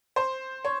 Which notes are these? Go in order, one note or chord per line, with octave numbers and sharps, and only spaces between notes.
C5
C#5